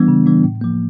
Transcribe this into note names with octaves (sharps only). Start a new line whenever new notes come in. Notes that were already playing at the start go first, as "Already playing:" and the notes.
Already playing: E3 G3 B3 D4
C#3
E3 G3 B3 D4
A2
F3 A#3